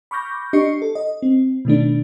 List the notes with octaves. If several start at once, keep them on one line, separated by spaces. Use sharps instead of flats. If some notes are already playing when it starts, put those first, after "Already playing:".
B5 C#6 D6 F6 G6 A#6
D4 G4 D#5 C#6 C7 C#7
A4
D#5
C4
B2 D#3 A3 D4